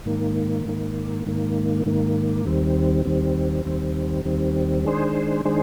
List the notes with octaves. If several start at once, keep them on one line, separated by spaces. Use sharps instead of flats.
G#2 D#3 A#3
G#2 D#3 A#3
G#2 D#3 A#3
G#2 D#3 A#3
D#2 D#3 G3 C4
D#2 D#3 G3 C4
D#2 D#3 G3 C4
D#2 D#3 G3 C4
D#3 G#3 D4 G#4 C5
D#3 G#3 D4 G#4 C5